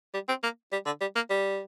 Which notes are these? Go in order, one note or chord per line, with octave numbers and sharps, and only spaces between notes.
G3
C4
A#3
G3
D3
G3
A#3
G3